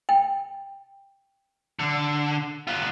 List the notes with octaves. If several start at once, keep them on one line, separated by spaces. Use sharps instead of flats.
G5
D3
B3 F4